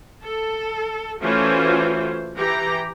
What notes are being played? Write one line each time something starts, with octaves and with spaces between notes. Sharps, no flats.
A4
E3 A3 C#4 F4 F#4 C5
E3 G4 A#5